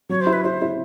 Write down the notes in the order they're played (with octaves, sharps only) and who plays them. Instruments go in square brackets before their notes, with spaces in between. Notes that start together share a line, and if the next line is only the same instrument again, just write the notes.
[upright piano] F#3 [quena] C#5
[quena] C5
[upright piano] E4
[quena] B4
[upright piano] E4 [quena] C5
[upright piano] E4